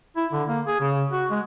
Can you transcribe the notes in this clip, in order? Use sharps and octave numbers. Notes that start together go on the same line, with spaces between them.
E4
D3
A#3
G#4
C#3
F#4
G#3